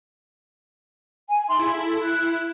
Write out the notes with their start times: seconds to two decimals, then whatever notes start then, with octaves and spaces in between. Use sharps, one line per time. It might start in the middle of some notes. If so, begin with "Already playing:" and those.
1.28 G#5
1.48 D#4 E5 C6
1.59 E4 G#4 F5
1.74 A4
2.02 F#6